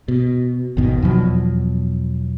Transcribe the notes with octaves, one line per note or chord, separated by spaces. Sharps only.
B2
G#1 E2 B2 D#3
E2 B2 F3 F#3